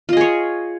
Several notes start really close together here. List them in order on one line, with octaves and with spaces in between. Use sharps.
F4 D#5 G#4 C#5